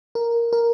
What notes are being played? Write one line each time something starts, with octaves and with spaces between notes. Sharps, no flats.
A#4
A#4